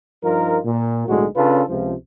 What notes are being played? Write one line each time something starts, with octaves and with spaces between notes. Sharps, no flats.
G2 F3 D#4 F4 A#4
A#2
B1 A2 D3 G#3 D#4 F#4
C#3 C#4 D4 F4 A4 B4
C#2 C3 F3